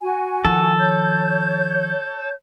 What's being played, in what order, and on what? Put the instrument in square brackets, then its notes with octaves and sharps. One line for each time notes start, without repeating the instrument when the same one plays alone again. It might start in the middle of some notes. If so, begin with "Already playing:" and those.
[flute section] F#4 G#5
[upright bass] D#3 F3 [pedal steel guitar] A4
[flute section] C#5 G6